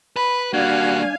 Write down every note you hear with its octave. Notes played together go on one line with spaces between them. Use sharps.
B4 B5
G3 A#3 D4 F#4 F5 G#5